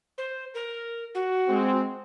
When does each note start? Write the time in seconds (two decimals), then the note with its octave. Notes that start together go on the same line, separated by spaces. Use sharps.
0.18 C5
0.54 A#4
1.14 F#4
1.48 G#3 C4